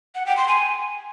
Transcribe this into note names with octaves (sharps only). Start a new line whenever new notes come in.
F#5
G5
C6
G#5